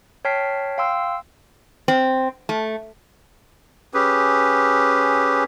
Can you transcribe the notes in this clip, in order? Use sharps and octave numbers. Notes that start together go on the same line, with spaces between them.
C#5 G5 A5 F6 B6 C7
F5 G5 C6 E6
C4
A3
C#4 G4 G#4 B4